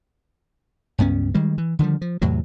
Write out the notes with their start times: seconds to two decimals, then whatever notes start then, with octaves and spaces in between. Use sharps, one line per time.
0.98 C#2 G2 B3 C#4
1.34 D#3 G3 G#3
1.58 E3
1.79 D3 D#3 F3 G3
2.02 F3
2.22 E2 A2 C3 F#3